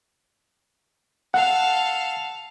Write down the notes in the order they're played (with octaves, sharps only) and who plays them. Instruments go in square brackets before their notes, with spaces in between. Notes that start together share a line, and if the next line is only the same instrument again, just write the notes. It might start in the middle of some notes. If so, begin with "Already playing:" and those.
[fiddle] A4 F5 [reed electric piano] F#5